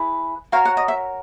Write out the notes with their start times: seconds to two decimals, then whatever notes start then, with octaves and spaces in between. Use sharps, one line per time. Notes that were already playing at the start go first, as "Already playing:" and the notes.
Already playing: E4 G#4 B4
0.52 F#4 A#4 C#5 F5
0.65 F#5
0.77 D#5
0.88 E5